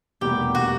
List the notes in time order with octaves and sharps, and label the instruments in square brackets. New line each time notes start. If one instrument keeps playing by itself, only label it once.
[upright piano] F1 E2 B2 G3 A#3 [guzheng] G4
[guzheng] F#4